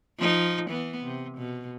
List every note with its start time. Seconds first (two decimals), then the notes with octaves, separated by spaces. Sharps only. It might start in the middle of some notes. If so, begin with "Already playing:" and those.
0.19 F3 D#4
0.70 E3 B3
1.04 C3
1.38 B2